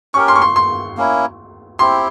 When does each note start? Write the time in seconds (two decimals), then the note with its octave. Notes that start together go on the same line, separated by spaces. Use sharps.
0.14 C#4 G4 A#4 C#6
0.28 C6
0.35 C#6
0.42 C6
0.56 C6
0.97 A#3 C#4 E4
1.79 C4 E4 G4 C6